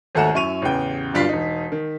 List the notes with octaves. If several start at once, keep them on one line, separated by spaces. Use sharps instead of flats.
G#1 D#2 A3 F#5 A#5 E7
F#2 E4 C#6 D#7 F7
A1 E2 C#3 G5
D1 G2 D4 F4 B6 C7
E1 D#4
D#3